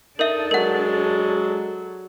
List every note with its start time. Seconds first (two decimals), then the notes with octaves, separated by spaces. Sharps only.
0.19 D4 D#4 A4 A#4 E5
0.51 F#3 G#3 A#4 F#5